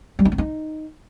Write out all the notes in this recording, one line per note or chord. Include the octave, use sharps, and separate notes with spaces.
G3
D#4
C4
D#4